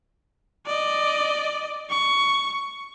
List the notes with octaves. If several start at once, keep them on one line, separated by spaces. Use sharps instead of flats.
D5 D#5
C#6